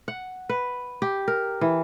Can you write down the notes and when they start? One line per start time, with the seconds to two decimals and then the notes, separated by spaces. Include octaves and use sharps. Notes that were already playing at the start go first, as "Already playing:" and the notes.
0.08 F#5
0.49 B4
1.02 G4
1.28 A#4
1.61 E3